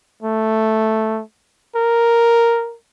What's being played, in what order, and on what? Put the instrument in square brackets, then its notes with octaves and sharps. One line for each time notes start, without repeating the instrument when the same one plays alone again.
[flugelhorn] A3
A#4